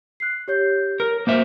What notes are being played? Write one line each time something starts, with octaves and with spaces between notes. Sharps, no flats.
F#6 C7
G4 C#5 G6
A#4 F6
A#3 C5 E5